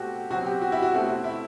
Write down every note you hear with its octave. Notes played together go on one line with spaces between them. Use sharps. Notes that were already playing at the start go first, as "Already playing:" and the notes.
Already playing: B2 A3 C4 F#4 G4
B2 F#3 C4 F#4
G4
F#4
E4
F#4
B2 A3 C4
E4